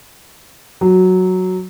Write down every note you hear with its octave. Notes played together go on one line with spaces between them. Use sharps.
F#3